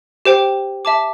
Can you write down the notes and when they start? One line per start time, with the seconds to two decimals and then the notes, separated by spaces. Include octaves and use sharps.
0.25 G4 C5 G5
0.85 E5 A5 D6